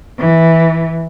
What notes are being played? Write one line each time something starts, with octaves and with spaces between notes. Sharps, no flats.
E3